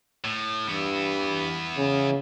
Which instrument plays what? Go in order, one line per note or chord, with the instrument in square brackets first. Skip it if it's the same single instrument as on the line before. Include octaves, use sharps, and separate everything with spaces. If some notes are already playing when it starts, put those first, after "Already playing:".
[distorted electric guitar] A2
[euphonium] G2 [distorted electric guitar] E3 B3
[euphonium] C#3